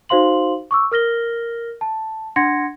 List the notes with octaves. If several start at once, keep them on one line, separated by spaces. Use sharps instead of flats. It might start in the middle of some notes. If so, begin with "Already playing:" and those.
D#4 F#4 C5 F5 C6 F#7
C#6 D6 E6
A#4 F6 A#6 G7
A5
D4 F#5 C6 G#6 A#6 C#7